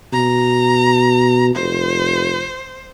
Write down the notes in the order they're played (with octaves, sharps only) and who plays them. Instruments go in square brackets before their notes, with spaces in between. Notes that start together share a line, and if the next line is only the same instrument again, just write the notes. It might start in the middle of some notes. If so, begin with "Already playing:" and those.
[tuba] B2 [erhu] A#5
[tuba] F1 [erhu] C5